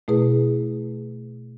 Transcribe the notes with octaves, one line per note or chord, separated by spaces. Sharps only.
B2 A3 E4 G#4 B4